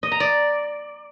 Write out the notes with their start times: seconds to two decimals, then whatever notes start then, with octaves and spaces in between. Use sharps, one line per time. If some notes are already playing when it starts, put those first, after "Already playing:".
0.03 D#5
0.12 A#5
0.20 D5